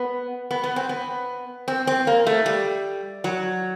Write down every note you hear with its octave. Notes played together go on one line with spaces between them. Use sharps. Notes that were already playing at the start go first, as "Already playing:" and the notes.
Already playing: B3
B3
B3
C4
B3
C4
C4
A#3
A3
G3
F#3